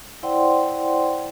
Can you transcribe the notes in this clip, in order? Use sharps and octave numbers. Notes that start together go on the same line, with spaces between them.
E4 C5 D5 F#5 G5 C6